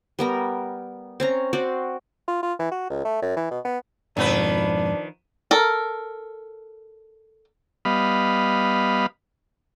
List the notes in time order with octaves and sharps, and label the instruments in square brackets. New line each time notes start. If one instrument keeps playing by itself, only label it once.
[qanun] G3 B3 A#4
C4 C#4 A#5
C4 F#4 D5
[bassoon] F4
F4
E3
F#4
C#2
A3
F#2
E3
B2
B3
[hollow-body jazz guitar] F2 G#2 B2 [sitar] D#3 F3 B4 [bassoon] D4
[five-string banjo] A4 A#4
[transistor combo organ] G3 B3 D#5 F5 B5